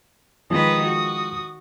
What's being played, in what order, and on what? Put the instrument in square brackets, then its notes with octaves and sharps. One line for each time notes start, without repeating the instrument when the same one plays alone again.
[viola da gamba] D#3 B4 [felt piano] F3 G#3 [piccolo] D#6
[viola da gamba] F#4